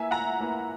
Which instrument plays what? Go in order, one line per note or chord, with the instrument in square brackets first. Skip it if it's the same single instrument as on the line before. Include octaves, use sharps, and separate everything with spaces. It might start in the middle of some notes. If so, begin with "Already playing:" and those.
Already playing: [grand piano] A#3 E4 B4 [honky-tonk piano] E5 G#5
[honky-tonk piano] F#5 A#5
[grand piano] A#3 E4 B4